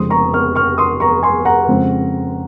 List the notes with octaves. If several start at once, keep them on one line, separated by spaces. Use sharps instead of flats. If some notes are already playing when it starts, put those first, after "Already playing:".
Already playing: F1 F2 C#3 G#3 C4 C6 D#6
A#5 C#6
C#6 F6
C#6 F6
C6 D#6
A#5 C#6
G#5 C6
F#5 A#5
F2 C#3 G#3 C4